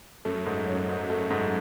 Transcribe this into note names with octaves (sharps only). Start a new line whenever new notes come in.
F#2 A3
G#2
F#3
G#2
F#2 A3
G#2